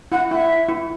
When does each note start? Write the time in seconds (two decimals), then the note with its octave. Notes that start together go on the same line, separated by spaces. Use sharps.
0.12 E4 F#5
0.30 E4 E5
0.68 E4